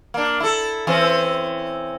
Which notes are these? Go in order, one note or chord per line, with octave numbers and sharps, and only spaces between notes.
A#3 D4
E4 A4
E3 C4 C#4